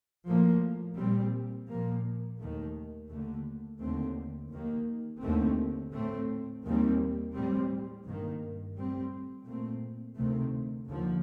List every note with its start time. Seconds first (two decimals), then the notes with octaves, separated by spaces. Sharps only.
0.27 A2 F3 A#3
0.97 A#2 G3 C4
1.68 A#2 F3 A#3
2.39 D#2 D#3 A3
3.10 D#2 D3 A3
3.81 D#2 D3 A3 C4
4.51 D#2 D#3 A#3
5.22 D#2 D3 A3 C4
5.92 A2 A3 C4
6.63 D#2 D#3 G3 C4
7.34 A2 G3 C4
8.04 G2 D#3 A#3
8.76 A2 G3 C4
9.46 A#2 A3 C4
10.17 D2 C3 D#3 A3 C4
10.88 D#2 D3 F3